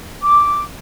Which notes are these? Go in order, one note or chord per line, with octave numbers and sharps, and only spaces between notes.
D6